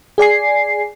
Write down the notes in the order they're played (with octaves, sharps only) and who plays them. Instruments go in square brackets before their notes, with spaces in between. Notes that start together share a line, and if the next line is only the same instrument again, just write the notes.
[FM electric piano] G#4 D5 G#5 C7